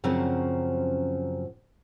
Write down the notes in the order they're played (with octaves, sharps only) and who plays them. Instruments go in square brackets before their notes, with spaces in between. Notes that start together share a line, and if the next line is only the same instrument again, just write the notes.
[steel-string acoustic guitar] F#2 C#3 F3 F#3 C4